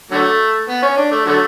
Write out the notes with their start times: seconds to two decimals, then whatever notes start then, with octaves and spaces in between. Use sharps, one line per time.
0.11 D3 F#3 A3
0.69 B3
0.83 C#4
0.97 D4
1.12 A3
1.26 D3 F#3 A3